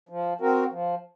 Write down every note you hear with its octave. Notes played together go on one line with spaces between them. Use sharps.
F3
C4 F#4 A#4
F3